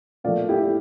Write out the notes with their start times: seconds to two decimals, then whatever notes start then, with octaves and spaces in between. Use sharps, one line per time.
0.24 A#2 F3 A3 D5 F5
0.49 E4 G4